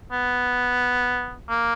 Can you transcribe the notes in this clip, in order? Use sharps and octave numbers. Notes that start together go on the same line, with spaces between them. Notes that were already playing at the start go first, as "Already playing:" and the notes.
B3
A#3